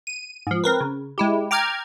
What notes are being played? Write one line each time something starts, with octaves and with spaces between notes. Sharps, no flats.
D#7
G#2 F3
C4 A#4 B4
C#3
G#3 E4 G4
G5 A#5 D6 F6 G#6